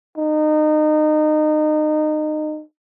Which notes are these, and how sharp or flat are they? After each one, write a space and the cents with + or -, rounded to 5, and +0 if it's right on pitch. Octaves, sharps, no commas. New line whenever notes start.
D#4 -25